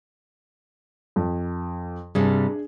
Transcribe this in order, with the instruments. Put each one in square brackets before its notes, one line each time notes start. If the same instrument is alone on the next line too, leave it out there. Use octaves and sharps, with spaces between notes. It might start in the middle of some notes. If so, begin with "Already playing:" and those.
[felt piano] F2
[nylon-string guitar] G2 C3 G3 [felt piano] D4 G#4